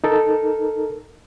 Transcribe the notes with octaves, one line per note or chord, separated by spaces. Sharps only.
D#4 A4 A#4